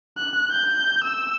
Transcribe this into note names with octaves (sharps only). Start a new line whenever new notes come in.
F#6
G6
E6